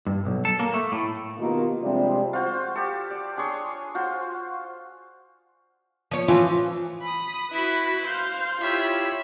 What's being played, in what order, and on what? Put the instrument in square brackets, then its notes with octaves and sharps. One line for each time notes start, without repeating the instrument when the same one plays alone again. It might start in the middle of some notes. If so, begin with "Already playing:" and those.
[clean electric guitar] G2
B1
A4
A#3
A3
A2
[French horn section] B2 D#3 A#3 B3 F4 G4
C3 F3 G3 G#3 C4 D4
[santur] F4 F#4 C5
G4 A4
D5
D4 G#4 C#5 C6
F4 F#4 C5
[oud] F3 C#5
[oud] E3 F3 [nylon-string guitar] F4
[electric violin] B5 D#6
[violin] E4 [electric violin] F#4 B4
[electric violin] C5 F5 [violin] G6
[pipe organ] E4 G4 C#5 [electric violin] F4 [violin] E5 B5